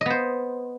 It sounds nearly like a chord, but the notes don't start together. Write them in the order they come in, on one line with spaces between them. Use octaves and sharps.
D#5 B3 C5